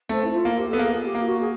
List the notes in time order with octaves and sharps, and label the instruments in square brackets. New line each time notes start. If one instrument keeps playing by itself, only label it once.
[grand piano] A3 [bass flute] C4
[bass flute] E4
F4
[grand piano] A#3
[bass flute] G4
[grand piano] B3 [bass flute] A4
[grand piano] A#3 [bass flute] G#4
[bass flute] G4
[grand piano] A#3
[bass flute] F4
F#4
G#4